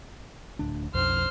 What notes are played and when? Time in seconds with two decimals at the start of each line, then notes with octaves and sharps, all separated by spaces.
0.59 D1 D2 D4
0.94 B1 F2 C5 F6